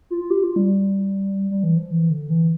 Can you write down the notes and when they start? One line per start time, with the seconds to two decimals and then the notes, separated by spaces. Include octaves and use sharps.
0.10 F4
0.21 F4
0.30 G4
0.44 F4
0.56 G3
1.51 G3
1.63 E3
1.76 F3
1.90 E3
2.10 D3
2.30 E3